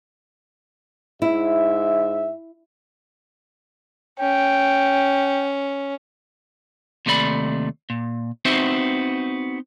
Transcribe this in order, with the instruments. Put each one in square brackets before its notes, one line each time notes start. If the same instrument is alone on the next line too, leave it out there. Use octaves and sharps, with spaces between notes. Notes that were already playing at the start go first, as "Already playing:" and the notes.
[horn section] G#2 E5 [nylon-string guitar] E4
[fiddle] C#4 [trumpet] G5
[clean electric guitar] D#2 C3 A3 D5 B5
A#2
B3 C4 D#4 F#4 C5 E5